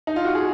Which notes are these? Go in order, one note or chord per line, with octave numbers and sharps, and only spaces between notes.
D#4
F4
F#4
G#4